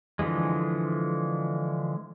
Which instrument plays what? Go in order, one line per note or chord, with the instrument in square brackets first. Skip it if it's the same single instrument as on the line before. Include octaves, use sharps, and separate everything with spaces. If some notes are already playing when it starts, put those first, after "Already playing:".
[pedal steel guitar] D3 E3 F3 G#3